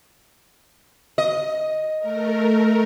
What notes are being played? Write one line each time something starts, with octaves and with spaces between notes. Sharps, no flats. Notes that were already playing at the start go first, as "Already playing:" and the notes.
D#5
A3 A#4